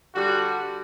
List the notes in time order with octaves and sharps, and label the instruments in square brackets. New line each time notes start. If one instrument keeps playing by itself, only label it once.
[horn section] D3 G3 F#4